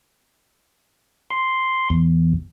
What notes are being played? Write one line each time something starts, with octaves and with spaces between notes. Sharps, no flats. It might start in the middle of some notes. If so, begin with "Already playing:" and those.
C6
E2